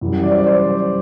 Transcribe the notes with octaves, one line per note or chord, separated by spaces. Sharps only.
F#2 E3 G3
D5
C5
D5
C5